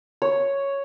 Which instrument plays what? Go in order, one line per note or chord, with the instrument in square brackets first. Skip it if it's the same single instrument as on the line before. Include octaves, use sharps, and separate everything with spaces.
[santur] C#5